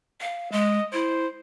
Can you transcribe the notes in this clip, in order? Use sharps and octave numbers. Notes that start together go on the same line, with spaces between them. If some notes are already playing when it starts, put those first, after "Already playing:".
F5
G#3 D#5
E4 C5